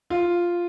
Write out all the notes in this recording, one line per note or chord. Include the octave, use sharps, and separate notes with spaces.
F4